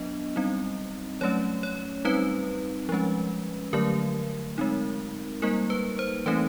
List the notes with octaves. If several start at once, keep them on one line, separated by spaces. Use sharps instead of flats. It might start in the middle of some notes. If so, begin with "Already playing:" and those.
Already playing: F#3 B3 D4 D#5
G3 C4 D#4
F#3 A3 C#4 C#5
C#5
G3 C4 D#4 B4
F3 G#3 C#4
D3 F#3 A3 A#4
G#3 C4 D#4
G3 A#3 D#4 A#4
B4
C5
E3 A3 C4 D#4 B4